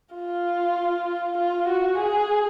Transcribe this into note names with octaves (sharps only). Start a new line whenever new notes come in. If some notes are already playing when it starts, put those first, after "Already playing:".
F4
F4
F#4
G#4